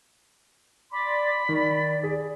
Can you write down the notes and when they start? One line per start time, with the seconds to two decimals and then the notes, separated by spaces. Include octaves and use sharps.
0.92 D5 B5 C6 D6
1.49 D#3 D5
2.03 G#4